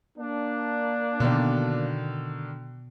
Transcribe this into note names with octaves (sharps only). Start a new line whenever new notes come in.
A#3 D4
B2 D3 D#3 D5